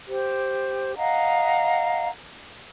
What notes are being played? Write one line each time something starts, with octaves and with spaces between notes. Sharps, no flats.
G4 C5
D#5 F5 F#5 A#5